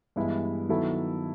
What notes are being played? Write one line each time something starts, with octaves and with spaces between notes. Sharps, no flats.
G2 E3 G#3 B3 E4
D#3 F#3 B3 E4 A4